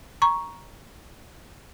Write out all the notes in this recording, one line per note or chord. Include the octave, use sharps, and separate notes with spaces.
A#5 C#6